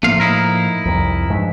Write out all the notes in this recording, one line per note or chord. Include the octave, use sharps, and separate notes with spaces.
A2 F3 A3 A#3 F5
D#4 E4 A#4
C2 F2
G2 F3 G#3